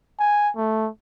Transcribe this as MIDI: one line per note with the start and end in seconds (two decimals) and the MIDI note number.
0.19 0.50 80
0.56 0.89 57